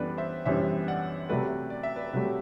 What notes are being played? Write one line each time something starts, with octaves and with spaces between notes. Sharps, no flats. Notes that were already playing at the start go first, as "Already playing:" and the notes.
Already playing: F#2 E3 G3 B3 D4 A4 B4 D5
C5 E5
F#2 E3 G3 B3 D4 C5 E5
D5 F#5
C3 F#3 A3 B4 D5
D5
E5
B4 D5
C3 F#3 A3 G4 B4